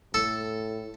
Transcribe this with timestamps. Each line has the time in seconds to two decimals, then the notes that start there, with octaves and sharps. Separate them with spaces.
0.14 A2 A4